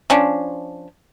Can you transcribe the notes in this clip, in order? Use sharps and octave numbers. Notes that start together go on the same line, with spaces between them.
F3 C#4 D4